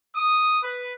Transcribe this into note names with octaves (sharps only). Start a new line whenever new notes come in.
D#6
B4